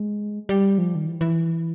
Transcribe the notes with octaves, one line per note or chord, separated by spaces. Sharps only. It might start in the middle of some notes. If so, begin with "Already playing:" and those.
Already playing: G#3
G3
F3
D#3
E3
E3